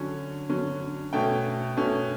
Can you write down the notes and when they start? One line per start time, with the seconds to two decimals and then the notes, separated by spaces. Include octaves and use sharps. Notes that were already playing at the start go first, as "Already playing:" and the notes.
Already playing: D3 F#3 C#4
0.49 D3 F#3 C#4
1.13 B2 A3 C#4 G5
1.77 B2 A3 C#4